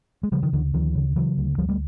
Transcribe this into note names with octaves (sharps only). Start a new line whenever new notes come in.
G#3
C#3 F3 G3
D#3 F3
D2 D3 E3
D2 D#3 F3
C#3
C#3 E3 F#3
D2
D2 F3 G3
G3 A3